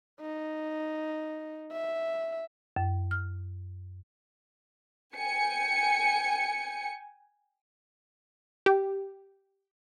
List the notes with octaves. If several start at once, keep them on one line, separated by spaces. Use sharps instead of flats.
D#4
E5
F#2
F6
G5 G#5 C#7
G4